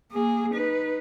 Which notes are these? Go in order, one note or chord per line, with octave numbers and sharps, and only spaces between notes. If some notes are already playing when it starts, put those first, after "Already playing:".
A#3 G#4
D#4 B4